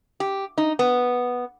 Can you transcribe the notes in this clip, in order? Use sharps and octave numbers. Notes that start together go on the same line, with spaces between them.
G4
D#4
B3